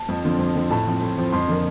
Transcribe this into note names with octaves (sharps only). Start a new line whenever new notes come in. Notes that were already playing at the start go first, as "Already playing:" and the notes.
Already playing: A5
F2
D3 F3 C4
F2
D3 F3 C4
A2 A5
F3 C4
A2
F3 C4
F2 C6
D3 F3 A#3